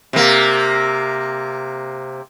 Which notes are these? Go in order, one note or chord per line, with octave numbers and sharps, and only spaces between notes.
C3 A#3